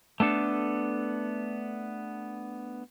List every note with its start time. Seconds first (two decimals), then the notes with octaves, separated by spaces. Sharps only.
0.20 A3 B3 D4 A4